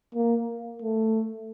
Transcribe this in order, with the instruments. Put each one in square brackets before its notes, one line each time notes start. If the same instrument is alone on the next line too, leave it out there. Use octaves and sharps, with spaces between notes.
[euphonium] A#3
A3